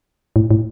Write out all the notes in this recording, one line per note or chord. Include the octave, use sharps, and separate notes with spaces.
A2
A2